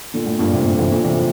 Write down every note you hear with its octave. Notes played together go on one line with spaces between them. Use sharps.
A#2 D3
A2
G2 A#2
A2 C3
A#2 D3
C3 E3
A#2 D3
C3 E3
F3